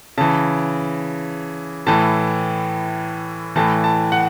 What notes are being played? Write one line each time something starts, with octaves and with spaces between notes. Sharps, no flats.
C#3 E3 A5
A2 E3 A5
A2 E3 A5
A5
F#5